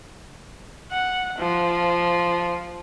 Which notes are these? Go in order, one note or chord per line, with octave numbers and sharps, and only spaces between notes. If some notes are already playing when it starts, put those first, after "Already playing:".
F#5
F3